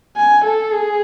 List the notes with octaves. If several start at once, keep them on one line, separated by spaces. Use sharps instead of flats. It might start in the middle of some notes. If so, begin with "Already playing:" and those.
G#5
A4
G#4